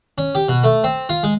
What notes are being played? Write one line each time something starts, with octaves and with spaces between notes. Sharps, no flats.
C#4
G4
B2
A3
C4
F4
G#3